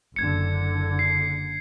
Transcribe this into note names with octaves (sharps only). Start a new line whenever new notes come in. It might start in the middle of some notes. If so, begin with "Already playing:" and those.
F#1 D3 G#6 C#7
C7